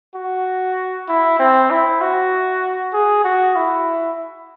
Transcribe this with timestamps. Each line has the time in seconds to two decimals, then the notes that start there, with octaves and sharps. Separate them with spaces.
0.15 F#4
1.08 E4
1.39 C4
1.70 E4
2.01 F#4
2.93 G#4
3.24 F#4
3.56 E4